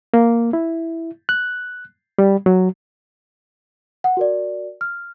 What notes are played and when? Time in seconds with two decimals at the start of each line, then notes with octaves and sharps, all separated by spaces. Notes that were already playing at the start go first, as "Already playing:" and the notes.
0.14 A#3
0.53 E4
1.29 F#6
2.18 G3
2.46 F#3
4.04 F#5
4.17 F#4 A#4 D5
4.81 F6